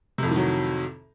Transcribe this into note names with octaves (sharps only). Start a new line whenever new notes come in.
F2 A2 C3 D#3 F#3